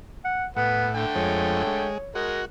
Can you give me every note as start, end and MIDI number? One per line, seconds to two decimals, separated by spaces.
0.25 0.46 78
0.57 1.06 45
0.57 0.87 59
0.57 0.93 78
0.95 1.88 50
0.95 1.88 57
0.95 1.88 79
1.16 1.63 41
1.16 1.63 56
1.16 2.22 73
1.67 1.98 56
2.15 2.41 56
2.15 2.45 66
2.15 2.41 70